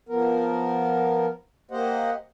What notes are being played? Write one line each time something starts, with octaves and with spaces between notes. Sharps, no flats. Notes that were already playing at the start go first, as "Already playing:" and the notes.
F3 B3 A#4
A#3 G4 C5 D#5 F#5